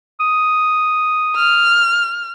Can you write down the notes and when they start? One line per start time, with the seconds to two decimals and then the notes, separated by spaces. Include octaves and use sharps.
0.20 D#6
1.36 F6